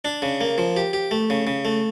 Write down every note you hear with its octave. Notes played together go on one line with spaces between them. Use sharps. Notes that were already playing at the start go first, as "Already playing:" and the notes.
D4
C#3
A#3
F3
G4
G4
A3
C#3
C#3
A3